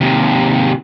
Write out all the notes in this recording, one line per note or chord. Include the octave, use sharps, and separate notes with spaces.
D#2 C3